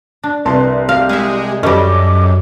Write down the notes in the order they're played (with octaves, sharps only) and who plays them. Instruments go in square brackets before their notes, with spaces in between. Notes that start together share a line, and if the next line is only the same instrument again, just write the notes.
[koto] D4
[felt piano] C2 A5 C6 [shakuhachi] B4
[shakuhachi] G4 [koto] F5
[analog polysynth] G#3 G#4 [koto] E5 F5
[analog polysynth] F#2 [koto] G3 C#4 [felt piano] G4 A4 D#5 [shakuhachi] D6